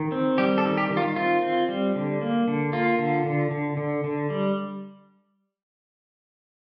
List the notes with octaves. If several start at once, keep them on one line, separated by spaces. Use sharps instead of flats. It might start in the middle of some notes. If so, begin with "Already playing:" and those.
Already playing: D#3
C4
G3 G4
A4
D#3
G4
D#3
F4
C4 F4
C4
G3
D3
A#3
D3
A#3 F4
D3
D3
D3
D3
D3
G3